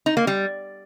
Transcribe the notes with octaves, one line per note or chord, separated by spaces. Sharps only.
D#4
A#3
G3